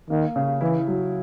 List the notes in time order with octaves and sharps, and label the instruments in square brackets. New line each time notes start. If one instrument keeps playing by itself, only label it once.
[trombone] D#3 [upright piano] A#3
[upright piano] C#3
[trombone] E3 [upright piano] E4
[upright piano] F#3